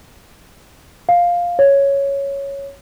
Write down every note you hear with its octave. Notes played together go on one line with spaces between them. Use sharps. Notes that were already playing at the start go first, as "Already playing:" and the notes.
F5
C#5